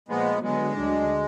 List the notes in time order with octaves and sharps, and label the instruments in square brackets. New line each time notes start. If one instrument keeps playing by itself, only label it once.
[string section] A#2 F3 A#3 [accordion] G#3 B3
[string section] D3 F#3 B3 [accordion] G#3
[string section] D2 D3 F#3 D4